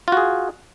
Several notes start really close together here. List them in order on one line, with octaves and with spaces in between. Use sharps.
F4 F#4 G#4